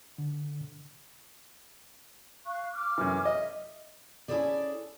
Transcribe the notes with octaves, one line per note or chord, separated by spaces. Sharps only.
D3
F5 C#6 F#6
D6 F6
F#2 E3
D#5 E5
C#4 E4 F4 G#4 A4 D5